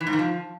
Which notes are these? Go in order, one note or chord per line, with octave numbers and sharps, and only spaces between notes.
E3
G#2
D#3
F3